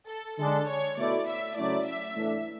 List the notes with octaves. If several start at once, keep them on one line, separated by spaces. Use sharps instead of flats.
A4
D3 G#3 D4 A4
C#5
B2 A3 E4 D5
E5
C#3 F#3 A3 E4 D5
E5
A2 E3 A3 D4